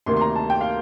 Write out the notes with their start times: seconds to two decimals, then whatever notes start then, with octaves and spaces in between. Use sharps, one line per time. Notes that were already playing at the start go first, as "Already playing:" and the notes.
0.06 D2 C3 D#3 A#3 C6
0.17 C6
0.21 A#5
0.36 A5
0.50 G5
0.61 F5